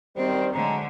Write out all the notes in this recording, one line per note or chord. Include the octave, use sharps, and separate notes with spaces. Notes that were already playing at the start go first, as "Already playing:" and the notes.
F#2 D#3 G3 C4 C5
D3 F#3 G#3 A3 A#5